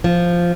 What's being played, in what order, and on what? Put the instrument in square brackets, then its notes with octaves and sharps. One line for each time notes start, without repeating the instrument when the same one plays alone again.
[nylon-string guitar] F3